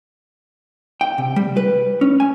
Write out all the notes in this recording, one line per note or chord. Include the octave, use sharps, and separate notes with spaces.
G5
C3
G3
B4
C#4
G#5